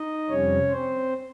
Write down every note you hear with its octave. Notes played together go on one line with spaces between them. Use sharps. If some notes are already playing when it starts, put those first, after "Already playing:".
Already playing: D#4 D#5
F2 C3 G3 C#4 C#5
C4 C5